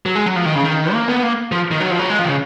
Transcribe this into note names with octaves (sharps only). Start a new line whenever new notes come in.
F#3
G#3
F#3
F3
D#3
C#3
D#3
A#3
B3
A#3
F3
D#3
F#3
F3
F#3
G#3
F3
D#3
C#3